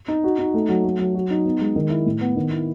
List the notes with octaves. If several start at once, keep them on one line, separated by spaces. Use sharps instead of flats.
D#4
F#4
D#4
A3
F#3
A3
F#3
F#4
D#4
B3
G#3
D#3
E4
A2
B3
D#3
E4